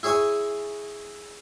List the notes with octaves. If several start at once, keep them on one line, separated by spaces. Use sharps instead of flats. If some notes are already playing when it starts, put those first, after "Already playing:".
E4 G#4 C#5 G#5